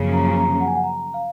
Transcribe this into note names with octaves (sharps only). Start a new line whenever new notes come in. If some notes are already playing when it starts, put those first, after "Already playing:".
Already playing: F#2 C#3 F3 A#3
A#5
G#5
A#5
F#5
G#5
F#5
A#5
F5